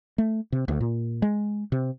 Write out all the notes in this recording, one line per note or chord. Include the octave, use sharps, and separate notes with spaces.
A3
C3
D2
A#2
G#3
C3